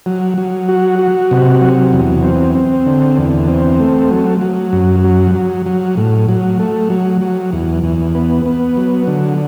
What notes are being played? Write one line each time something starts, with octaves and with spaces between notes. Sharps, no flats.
F#3
F#3
F#4
F#4
C3
F#3
E2
C4
C4
D3
E2
C4
A3
F#3
F#3
F#2
F#3
F#3
F#3
A2
F#3
A3
F#3
F#3
E2
E2
B3
B3
F#3
D3